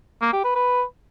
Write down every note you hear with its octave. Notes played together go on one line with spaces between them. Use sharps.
A#3
G4
B4
B4